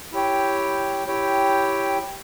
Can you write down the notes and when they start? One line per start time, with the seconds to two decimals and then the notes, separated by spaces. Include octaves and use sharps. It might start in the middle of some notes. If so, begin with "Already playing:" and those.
0.12 E4 G4 C#5 G5
1.07 E4 G4 C#5 G5